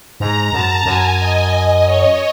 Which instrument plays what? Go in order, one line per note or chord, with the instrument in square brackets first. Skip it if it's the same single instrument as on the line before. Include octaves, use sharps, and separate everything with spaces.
[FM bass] G#2 [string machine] A#5
[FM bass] F#2 [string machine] A5
[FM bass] F#2 [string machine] G#5
[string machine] D#5
C#5